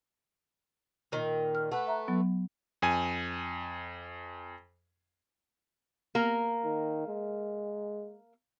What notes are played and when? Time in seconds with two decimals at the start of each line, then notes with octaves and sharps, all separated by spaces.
1.12 A#2 D#3
1.55 F6
1.72 A3 B4 F#5
1.87 E5 A#5
2.08 F#3 B3
2.82 F2 G#5
6.15 A#3 A#4
6.64 D#3
7.07 G#3